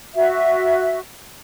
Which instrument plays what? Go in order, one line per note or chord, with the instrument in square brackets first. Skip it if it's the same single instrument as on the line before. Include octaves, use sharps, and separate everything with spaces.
[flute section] F#4 E5